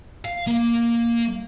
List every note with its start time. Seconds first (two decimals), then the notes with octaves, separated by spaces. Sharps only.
0.25 F5
0.47 A#3